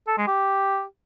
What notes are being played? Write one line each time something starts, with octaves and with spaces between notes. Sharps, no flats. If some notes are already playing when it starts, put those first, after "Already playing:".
A4
G#3
G4